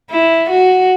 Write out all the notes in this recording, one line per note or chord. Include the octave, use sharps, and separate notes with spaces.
E4
F#4